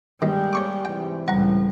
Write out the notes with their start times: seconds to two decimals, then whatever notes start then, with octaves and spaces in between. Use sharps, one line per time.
0.22 G2 D#3 G3 G#3 A#3 G4 G5
0.53 C#5 C#6 D6
0.85 G#2 C3 E3 G5
1.28 C#2 A2 G3 F#5 A#5